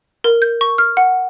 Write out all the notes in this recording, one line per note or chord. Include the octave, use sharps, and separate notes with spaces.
A#4
G6
C#6
F6
F#5